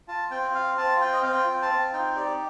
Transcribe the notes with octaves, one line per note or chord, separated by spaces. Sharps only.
F4 A5
C4 G5
F4 F5
C4 A5
F4 G5
D#5
C4 F5
G5
F4
A5
C4
D#4 G5
G4 D5